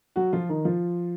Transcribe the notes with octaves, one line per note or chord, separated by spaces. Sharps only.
F#3 F#4
F3 F4
D#3 D#4
F3 F4